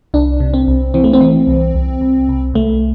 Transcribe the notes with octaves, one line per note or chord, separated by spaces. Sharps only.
C2 D4
C3
C4
C2
E3 C4
A3
C4
E3
C2
C2
C2
C2
C2 A3